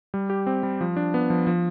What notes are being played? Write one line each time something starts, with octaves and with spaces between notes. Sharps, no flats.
G3
G4
C4
G3
F3
D4
B3
F3
F3